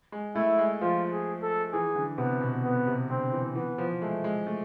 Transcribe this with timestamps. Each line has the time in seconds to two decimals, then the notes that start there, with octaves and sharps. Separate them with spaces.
0.12 G#3
0.35 A3 E4
0.58 G#3
0.81 F3 F4
1.12 G#4
1.42 A4
1.73 E3 G#4
1.95 D3
2.18 C3 B3
2.41 B2
2.64 B3
2.87 C3
3.09 D3 C4
3.32 E3
3.55 E3 B3
3.78 F3
4.01 G#3 A3
4.24 G#3
4.47 A3